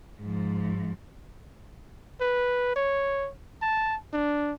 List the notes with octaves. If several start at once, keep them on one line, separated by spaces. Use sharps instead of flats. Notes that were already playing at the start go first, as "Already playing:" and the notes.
G#2 F3
B4
C#5
A5
D4